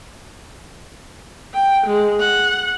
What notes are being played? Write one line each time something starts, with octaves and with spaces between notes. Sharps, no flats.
G5
G#3
F#5